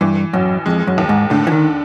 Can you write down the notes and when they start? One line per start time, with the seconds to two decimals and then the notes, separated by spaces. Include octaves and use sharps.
0.01 G2 E3
0.33 A1 F#2
0.66 F2 G#3
0.87 F#2
0.98 D#2
1.09 G#2
1.30 A2 D3
1.47 E3
1.52 D#3